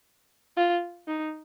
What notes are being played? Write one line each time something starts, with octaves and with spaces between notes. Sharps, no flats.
F4
D#4